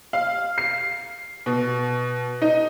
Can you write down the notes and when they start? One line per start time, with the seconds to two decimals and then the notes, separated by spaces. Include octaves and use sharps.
0.13 F5
0.58 C7
1.46 B2
2.42 D#4